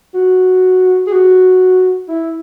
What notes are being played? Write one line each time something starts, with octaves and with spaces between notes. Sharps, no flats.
F#4
G#4
F#4
E4